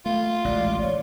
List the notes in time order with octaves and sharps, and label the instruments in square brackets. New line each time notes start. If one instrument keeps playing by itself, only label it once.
[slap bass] A3 [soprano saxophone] F4
[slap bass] A1 D2 G#3 [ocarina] D5
[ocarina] C#5